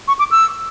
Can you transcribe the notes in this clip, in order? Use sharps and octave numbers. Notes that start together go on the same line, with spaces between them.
C#6
D6
E6